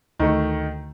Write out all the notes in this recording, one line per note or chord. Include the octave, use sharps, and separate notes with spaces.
D2 D#3 A3